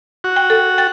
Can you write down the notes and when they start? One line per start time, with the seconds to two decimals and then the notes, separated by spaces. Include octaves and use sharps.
0.24 F#4
0.36 G5
0.50 A4
0.78 G5 A6